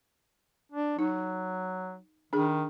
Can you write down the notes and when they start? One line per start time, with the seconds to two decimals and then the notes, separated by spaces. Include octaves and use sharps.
0.72 D4
0.99 F#3 D#4
2.33 D#3 D4 G#4